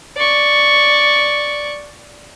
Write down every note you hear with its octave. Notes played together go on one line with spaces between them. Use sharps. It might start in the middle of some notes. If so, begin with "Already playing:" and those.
D5 C#6